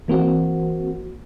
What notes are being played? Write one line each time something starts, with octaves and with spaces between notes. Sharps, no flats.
E3 A#3 C4 F#4